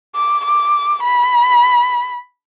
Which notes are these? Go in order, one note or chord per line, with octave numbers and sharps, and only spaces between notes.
D6
D6
B5